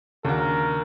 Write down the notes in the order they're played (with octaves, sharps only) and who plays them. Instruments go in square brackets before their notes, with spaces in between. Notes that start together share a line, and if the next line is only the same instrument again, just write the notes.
[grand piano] D#2 D4 F#4 [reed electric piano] C#3 [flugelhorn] A#4